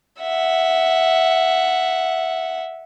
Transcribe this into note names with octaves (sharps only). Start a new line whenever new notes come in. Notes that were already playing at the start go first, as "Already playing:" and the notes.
E5 F#5